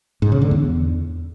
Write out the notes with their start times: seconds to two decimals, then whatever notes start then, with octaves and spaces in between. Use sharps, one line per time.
0.22 G#2
0.32 C#3
0.41 D3
0.51 E2